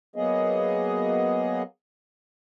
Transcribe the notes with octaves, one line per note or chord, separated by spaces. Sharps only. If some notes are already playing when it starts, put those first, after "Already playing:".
F#3 A#3 B3 G#4 D#5